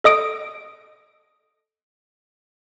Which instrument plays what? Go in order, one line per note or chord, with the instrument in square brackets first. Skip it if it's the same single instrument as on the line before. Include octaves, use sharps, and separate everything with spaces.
[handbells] A4 D#5 D#6 D7